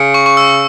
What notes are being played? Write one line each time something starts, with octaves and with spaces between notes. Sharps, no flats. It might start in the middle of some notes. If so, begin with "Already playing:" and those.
Already playing: C#3
C#6
C#6
E6